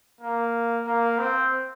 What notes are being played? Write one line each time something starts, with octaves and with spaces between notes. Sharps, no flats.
A#3
A#3
C4